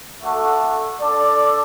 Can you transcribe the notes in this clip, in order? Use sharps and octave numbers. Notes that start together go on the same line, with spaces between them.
A3 D4 F#4 A4
D4 A4 D5